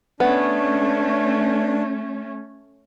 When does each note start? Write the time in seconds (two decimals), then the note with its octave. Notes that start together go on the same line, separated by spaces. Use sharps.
0.20 A3 B3 C#4 D4